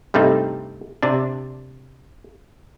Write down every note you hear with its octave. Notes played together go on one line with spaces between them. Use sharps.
G2 C3 A3 C4 D#4
C3 D4